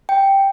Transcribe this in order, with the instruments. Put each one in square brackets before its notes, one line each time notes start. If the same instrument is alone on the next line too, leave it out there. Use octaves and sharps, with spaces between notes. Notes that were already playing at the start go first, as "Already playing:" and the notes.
[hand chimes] G5